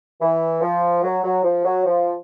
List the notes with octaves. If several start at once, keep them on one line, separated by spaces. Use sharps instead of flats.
E3
F3
F#3
F#3
F3
F#3
F3